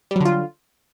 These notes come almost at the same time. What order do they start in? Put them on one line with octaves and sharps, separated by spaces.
G3 F#3 D3 F4